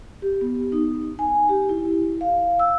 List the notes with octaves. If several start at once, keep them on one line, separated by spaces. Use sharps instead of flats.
G4
B3
D#4
G#5
G4
E4
F5
E6